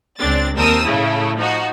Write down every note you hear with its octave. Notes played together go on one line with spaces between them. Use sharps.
C#2 C4 D4 A6
D#2 C4 A#4 A5 D#6 E6
A2 C#3 A3 E4
F3 D#4 F#4